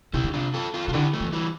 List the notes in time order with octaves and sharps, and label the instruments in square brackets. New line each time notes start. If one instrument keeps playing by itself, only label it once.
[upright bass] C3 [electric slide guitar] E4 G4
[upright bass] D3
[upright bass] C3 [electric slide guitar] D4 F4
[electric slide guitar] F4 A4
F4 A4
[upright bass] C3 [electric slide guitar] F4
[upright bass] D3 [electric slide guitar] E4 G4
[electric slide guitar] F3 A3
[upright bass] E3
[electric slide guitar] E3 G3